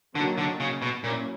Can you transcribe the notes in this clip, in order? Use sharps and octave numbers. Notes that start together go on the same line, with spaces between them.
D3 D#3 F#3 A#3 D#4
D3
C#3
B2
A#2 F#3 A#3 C#4 E4